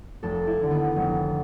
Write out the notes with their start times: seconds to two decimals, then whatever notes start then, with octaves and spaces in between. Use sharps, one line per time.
0.23 F1 A4
0.47 E4
0.59 D#2 D3
0.71 B3
0.96 F1